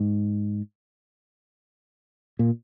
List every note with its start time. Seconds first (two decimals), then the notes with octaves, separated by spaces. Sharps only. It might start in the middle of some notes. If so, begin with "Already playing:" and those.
Already playing: G#2
2.39 A#2